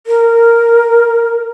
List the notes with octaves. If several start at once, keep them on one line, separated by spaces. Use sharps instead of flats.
A#4